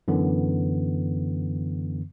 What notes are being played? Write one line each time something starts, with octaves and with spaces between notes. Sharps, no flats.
F#2 D3 E3 B3